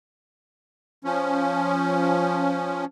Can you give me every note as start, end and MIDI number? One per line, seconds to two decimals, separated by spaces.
1.04 2.85 53
1.04 2.85 61